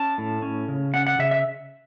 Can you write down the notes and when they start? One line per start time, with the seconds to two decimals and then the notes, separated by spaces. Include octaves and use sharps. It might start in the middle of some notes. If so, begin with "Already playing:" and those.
Already playing: C#4 A5
0.18 A2
0.42 C#4
0.68 C#3
0.94 C#4 F#5
1.07 F#5
1.19 C#3 E5
1.31 E5